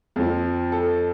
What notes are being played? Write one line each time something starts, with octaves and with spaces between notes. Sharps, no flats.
F2 F3
A4